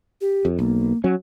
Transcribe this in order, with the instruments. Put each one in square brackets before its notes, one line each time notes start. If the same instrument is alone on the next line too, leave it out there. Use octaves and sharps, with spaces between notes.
[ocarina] G4
[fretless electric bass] F2
[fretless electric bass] B1 [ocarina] A#3
[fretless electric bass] F#3 C#4